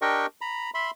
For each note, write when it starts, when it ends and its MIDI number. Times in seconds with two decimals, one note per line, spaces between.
0.02 0.26 62
0.02 0.26 67
0.02 0.26 70
0.02 0.26 75
0.02 0.26 79
0.02 0.26 85
0.41 0.70 82
0.41 0.70 83
0.74 0.91 76
0.74 0.91 83
0.74 0.91 84